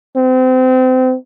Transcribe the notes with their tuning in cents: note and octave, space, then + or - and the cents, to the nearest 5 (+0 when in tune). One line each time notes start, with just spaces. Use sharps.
C4 -30